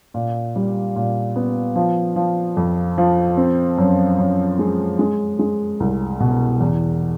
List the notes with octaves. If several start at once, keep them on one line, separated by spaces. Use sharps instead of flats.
A#2
G3
A#2
B3
F3
F3
F2
F3
C4
F#2
F#2
G#3
G#3
G#3
C2
B2
E2